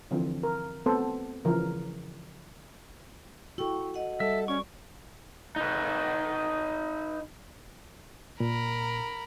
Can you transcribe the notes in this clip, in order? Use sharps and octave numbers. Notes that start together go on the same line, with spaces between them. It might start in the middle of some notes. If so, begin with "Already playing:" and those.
D3 E3 F3 C4
A#4
A3 B3 C4 A4 C5
C#3 E3 F3 A#4
E4 F#4 A4 G5 C#6
D#5 F#5
G3 A4 E5
C#4 D5 C#6
D#4 B4
A#2 A#4 B5